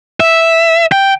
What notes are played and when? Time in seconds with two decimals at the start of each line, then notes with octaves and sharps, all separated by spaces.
0.20 E5
0.92 G5